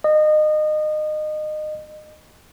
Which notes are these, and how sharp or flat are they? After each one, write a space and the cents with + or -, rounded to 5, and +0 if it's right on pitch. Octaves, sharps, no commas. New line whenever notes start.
D#5 -25